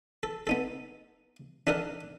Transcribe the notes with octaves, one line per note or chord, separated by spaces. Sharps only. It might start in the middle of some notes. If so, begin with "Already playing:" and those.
A4
B3 D#4 A4
D4 D#4 A4 A#4 F#5